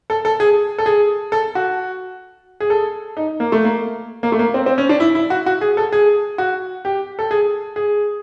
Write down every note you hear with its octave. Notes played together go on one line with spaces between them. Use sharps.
A4
A4
G#4
A4
G#4
A4
F#4
G#4
A4
D#4
A#3
A3
A#3
A#3
A3
A#3
C4
C4
C#4
D4
E4
E4
F#4
F#4
G#4
A4
G#4
F#4
G4
A4
G#4
G#4